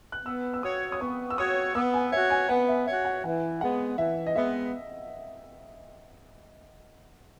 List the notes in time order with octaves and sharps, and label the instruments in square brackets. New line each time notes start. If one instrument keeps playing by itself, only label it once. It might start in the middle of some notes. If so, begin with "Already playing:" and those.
[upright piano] F#6
[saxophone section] B3 [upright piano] E6
[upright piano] E6
[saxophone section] F#4 C#5 [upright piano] D#6
[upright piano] D#6
[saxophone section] B3 [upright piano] C#6
[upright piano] E6
[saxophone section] F#4 C#5 [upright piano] D#6
[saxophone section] B3 [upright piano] E6
[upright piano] G#5
[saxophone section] F#4 C#5 [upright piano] E5
[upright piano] G#5
[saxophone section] B3 [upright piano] F#5
[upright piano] E5
[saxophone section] F#4 C#5 [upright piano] E5
[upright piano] F#5
[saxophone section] E3 [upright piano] F#5
[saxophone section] G#3 B3 [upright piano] F#5
[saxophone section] E3 [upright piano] E5
[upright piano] D#5
[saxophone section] G#3 B3 [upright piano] E5